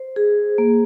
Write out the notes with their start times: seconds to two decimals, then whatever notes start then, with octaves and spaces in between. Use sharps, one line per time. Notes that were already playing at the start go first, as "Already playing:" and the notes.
Already playing: C5
0.16 G#4
0.58 A#3